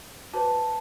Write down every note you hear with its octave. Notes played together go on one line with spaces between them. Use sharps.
F#4 B4 C5 A5